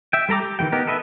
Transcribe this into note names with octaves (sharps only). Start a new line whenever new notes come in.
E5 G5
G3 A4 A#5 D6
G4
D#3 E3 G3 G5
B3 D#4 G4 A#4
A4 B4 D#5 E5